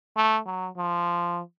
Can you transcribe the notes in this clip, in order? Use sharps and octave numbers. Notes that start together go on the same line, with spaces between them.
A3
F#3
F3